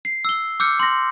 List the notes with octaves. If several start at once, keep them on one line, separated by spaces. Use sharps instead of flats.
C7
E6 G7
D6 E6 F6 G6 C#7
C6 A#6